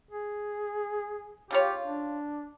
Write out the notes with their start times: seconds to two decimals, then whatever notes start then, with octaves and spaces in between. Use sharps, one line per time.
0.11 G#4
1.51 C#3 F4 G4 C#5
1.84 D4